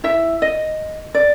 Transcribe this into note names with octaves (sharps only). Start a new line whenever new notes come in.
E4 E5
D#5
D5